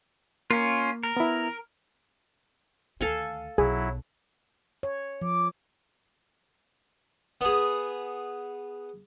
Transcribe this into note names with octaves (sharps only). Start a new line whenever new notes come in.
A#3 C#4 F4
A#4
B3 E4
D2 D#3 A4 F5 G#5
B1 F#3 E4 G#4
C#5
F3 D6
B3 G#4